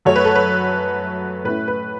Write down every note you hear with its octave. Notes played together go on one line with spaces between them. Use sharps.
F#2 F#3 A3 C#5
B4
A4
B4
A2 A3 C#4 E4 B4
B4